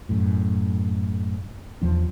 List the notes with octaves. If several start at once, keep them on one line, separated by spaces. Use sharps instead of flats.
F#2 A2
E2 F3 D4